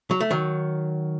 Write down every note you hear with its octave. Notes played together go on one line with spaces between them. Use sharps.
F#3
A3
D#3 F#3